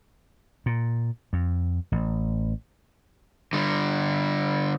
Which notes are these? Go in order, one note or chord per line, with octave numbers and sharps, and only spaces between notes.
A#2
F2
A1
D3 G3